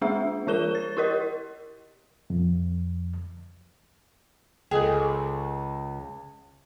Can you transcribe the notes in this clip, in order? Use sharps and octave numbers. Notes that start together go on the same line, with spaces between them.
G#3 A#3 D4 G#4 E5
E3 F4 A#4 E7 G7
A6
E4 G4 A#4 D#5
F2
C#2 G#4 A4 D#5 G5